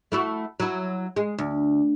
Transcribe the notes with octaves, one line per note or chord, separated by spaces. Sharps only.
A3 E4 F#4
F#3 E4
G#3
D2